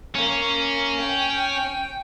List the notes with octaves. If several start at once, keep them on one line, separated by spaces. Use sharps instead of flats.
A#3 C#4
G5